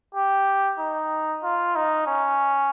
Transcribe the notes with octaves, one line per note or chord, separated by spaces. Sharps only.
G4
D#4
F4
D#4
C#4